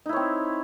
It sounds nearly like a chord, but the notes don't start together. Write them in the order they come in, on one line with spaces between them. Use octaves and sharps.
D#4 E4 C#5 C4